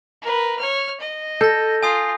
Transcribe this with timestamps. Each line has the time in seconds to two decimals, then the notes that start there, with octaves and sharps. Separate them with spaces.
0.22 A#4 B4
0.59 C#5 F6
1.00 D#5
1.41 A4 G6 A#6
1.83 F4 G#5 D#6 C7